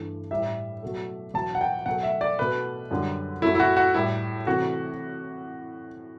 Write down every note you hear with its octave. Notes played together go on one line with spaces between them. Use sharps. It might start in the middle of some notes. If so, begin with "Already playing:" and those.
Already playing: G2 E3 A3
A2 G3 E5
B2 F#3 A3
E2 B2 F#3 A5
F#5
G5
B2 F#3 A3 F#5
E5
D5
B2 A3 B4
F#2 D3 G3
F#2 F#3 A3 E4
E4
F#4
F#4
A2 G3 E4
C3 E3 A3 F#4